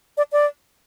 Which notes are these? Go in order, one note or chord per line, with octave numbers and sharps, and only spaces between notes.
D5
D5